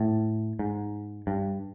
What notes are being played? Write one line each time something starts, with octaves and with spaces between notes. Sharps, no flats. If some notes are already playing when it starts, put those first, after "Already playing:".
Already playing: A2
G#2
G2